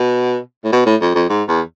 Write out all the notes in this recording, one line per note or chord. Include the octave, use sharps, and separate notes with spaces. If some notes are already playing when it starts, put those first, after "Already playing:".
Already playing: B2
A2
B2
A2
F2
F2
G#2
E2